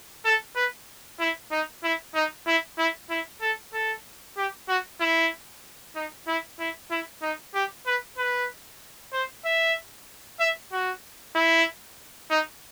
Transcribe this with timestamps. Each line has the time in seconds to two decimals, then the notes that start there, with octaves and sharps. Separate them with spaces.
0.25 A4
0.56 B4
1.20 E4
1.51 D#4
1.83 E4
2.15 D#4
2.47 E4
2.78 E4
3.10 E4
3.41 A4
3.74 A4
4.37 G4
4.68 F#4
5.00 E4
5.96 D#4
6.27 E4
6.60 E4
6.91 E4
7.22 D#4
7.54 G4
7.86 B4
8.18 B4
9.13 C5
9.45 E5
10.40 E5
10.72 F#4
11.35 E4
12.30 D#4